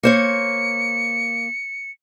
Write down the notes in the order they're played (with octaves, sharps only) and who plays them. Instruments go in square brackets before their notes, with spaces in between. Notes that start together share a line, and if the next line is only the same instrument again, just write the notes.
[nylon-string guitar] A#3 C5 C#5 [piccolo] C#7